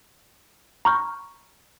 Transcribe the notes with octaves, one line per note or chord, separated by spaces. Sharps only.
A#5 B5 C#6 F6 G6